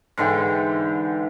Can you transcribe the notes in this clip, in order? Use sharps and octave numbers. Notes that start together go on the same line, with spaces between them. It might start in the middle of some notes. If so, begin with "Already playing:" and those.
G#2 D3 E3 G5